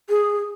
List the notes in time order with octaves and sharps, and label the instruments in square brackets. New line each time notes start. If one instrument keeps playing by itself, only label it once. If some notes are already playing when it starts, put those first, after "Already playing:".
[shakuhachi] G#4